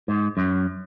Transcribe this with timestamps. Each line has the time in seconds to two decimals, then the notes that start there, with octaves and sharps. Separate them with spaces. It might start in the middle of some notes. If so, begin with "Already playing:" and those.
0.08 G#2
0.37 F#2